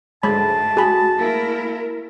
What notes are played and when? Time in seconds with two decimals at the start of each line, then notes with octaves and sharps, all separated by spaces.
0.23 D2 G#2 G#3 A3 A5 B5
0.77 F#4 G#4 B5
1.20 A3 A#3 E4 A#4